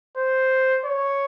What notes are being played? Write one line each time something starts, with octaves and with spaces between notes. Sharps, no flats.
C5
C#5